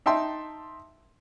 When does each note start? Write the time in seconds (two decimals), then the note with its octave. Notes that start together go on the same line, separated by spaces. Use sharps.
0.06 D#4 E5 G5 A5 C6